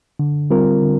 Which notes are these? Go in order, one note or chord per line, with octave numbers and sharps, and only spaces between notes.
D3
G3 C4 F4 A#4
D3